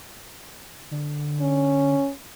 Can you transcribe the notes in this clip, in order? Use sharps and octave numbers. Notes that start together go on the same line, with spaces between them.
D3
C#4